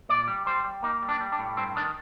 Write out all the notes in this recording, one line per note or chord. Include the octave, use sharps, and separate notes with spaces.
A#2 D5
G3
G3 C5
G3
A#3 D#4
G3
D4
G3
D4
A2
G2 C4
D#3 D4